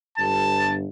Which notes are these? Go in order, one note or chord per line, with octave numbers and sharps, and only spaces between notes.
G1 G2 A5